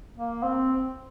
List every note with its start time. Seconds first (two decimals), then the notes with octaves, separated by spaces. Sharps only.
0.16 A#3
0.44 C4